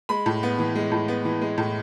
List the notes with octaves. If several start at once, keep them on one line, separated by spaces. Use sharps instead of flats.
G#3 B5
A2
B3
E3
G#3
A2
B3
E3
G#3
A2